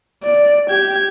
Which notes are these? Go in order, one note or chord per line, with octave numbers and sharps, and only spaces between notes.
D5
G4 G#6